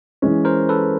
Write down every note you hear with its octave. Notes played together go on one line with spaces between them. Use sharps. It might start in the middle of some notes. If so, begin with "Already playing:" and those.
E3 G#3 C#4
A#4 C5
A4 B4